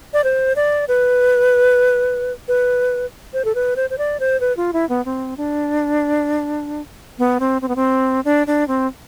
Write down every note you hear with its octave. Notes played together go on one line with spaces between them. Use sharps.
D5
C5
D5
B4
B4
C5
A4
B4
C5
C5
D5
C5
B4
F4
E4
B3
C4
D4
B3
C4
C4
B3
C4
D4
D4
C4